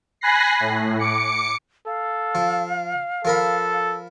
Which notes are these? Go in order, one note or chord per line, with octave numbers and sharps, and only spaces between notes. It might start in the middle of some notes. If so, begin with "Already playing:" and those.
G#5 B5 F#6 A#6 C7
A2
D6 C#7
A4 F5
F3
F3 A4 A#4 B5